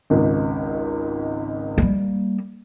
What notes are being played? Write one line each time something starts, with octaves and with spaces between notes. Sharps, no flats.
G#1 C#2 G#2
G3 A#3